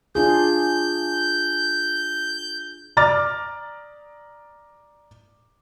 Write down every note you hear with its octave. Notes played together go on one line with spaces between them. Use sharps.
D4 F4 G#4 G6
D5 A#5 D6 F6 A6